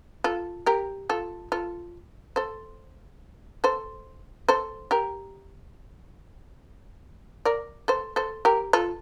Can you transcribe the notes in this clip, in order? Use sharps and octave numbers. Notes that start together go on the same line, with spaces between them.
F4 A4
G4 A#4
F4 A4
F4 A4
A4 C5
A4 C5
A4 C5
G4 A#4
A#4 D5
A4 C5
A4 C5
G4 A#4
F4 A4